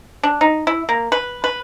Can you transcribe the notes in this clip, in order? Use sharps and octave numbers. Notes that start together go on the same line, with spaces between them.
D4
D#4
E4
A#3
B4
B4